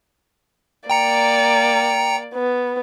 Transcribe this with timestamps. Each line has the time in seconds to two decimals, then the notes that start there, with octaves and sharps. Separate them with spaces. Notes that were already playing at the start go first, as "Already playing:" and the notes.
0.90 A#3 D5 G5 A#5 C#7
2.34 B3